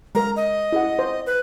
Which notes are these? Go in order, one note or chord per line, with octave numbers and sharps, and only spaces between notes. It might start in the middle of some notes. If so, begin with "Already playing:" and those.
G#3 A#4 A#5
D#5
E4 G#4 F#5
C5
B4